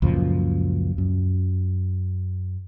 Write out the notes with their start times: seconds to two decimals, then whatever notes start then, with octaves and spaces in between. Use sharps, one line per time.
0.02 C#2 F#2 A#2 F3
0.98 F#2